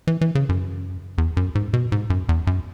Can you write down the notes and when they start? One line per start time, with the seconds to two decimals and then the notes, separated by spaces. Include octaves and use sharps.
0.07 E3
0.21 E3
0.35 C#3
0.49 F#2
1.18 E2
1.37 F#2
1.55 G#2
1.73 B2
1.92 G#2
2.10 F#2
2.29 E2
2.47 F#2